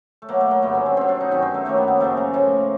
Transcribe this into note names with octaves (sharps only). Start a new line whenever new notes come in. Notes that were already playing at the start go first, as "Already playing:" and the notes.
A3
B2 F#3 A#3
A3
A#3
G2 D3 F#3 B3
C#4
C4
B2 F#3 C4
D4
D#4
G2 D#3 F#3 C#4
C4
A3
F#2 D#3 F#3 A#3
B3
A#3
F#2 C#3 F3 A3
A#3
A2 F3 A#3